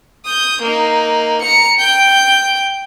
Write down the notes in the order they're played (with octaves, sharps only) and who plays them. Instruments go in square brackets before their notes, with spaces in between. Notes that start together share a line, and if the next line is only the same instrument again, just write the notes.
[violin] D#6 G6
A#3 D#4
A#5 C#7
G5 G6